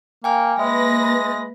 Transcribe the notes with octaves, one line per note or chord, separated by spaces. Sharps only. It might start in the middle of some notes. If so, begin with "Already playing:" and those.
A#3 G5 G#5 F6
G#3 A#3 B4 E5 A#6